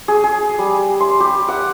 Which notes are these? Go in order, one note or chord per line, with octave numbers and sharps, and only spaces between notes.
G#4
G#4
G3
C6
G4
F#5